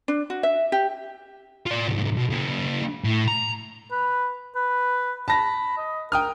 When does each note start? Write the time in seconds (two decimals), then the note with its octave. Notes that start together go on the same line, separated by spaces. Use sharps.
0.08 D4
0.30 F#4
0.43 E5
0.72 G4
1.66 F4 D5
1.88 C2 G#2
2.16 B2
2.30 C#3 A#3
3.04 A2
3.28 A#5
3.92 B4
4.55 B4
5.28 A5 B5 A#6
5.77 D#5
6.12 A#4 G5 D#6 F6